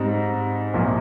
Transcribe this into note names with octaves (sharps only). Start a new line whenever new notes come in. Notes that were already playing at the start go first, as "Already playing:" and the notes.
Already playing: G#2 G3 C4 D#4
C2 A#2 F3